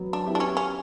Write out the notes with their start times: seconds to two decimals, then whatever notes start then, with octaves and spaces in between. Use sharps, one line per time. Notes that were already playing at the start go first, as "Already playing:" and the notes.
Already playing: F#3 B3
0.13 D4
0.26 B3 E4 G4
0.35 D4
0.40 C#4
0.57 C#4